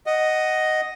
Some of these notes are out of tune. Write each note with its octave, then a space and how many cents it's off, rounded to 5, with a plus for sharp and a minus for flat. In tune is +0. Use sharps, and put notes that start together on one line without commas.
D#5 +0 F#5 +5